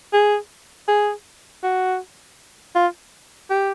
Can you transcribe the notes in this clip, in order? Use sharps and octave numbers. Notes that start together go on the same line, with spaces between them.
G#4
G#4
F#4
F4
G4